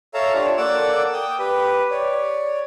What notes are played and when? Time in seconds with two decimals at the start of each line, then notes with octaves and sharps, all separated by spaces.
0.14 A4 C#5 E5 F5 A5 A#5
0.34 D4 F4 G4 C#5 D5
0.57 A#3 A4 D5 F#5 D6 E6
1.13 G5 D#6
1.39 G4 B4
1.91 C#5 D5